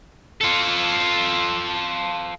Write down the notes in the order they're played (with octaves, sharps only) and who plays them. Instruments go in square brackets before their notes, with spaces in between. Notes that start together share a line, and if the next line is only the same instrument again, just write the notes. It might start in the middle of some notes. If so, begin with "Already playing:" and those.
[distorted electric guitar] F4 A4